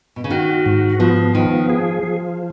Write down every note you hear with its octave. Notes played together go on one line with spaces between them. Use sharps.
B2
C#3
D#3 F#4
G#2
F3 B3
D#3 F3
G#4
F3